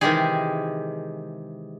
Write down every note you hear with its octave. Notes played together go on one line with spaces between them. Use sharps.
C3 D#3 E3 G#3 G4 G#4